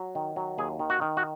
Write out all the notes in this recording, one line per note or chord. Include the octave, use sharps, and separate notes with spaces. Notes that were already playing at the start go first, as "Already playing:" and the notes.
Already playing: F#3
D#3
F#3
D#2 G#4
D#3
F#4
D#3
F#4